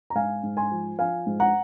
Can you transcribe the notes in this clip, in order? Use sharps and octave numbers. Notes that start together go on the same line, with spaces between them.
A#5
G#2 F5 G#5
G#2
G#5 C6
F3
F3 F5 G#5
G#2
F#5 A#5